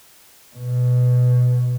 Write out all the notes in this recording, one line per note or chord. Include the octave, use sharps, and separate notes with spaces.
B2